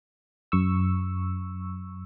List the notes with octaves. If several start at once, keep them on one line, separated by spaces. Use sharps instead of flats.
F#2 C#6 E6